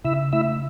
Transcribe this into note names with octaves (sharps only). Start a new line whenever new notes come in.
C#3 E4 E5
A3 E4 E5